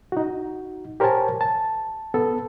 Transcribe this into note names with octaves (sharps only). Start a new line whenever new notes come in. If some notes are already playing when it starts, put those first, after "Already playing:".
D#4 F#4
G4 A#4 C5 C#5 G#5 A5
A5
B3 A4